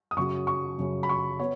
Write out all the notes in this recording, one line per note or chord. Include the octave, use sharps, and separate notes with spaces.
D#6
F#2 C#3 F#3 C#6
C#6
F#2 C#3 F#3
B5
C#6
B3 C#5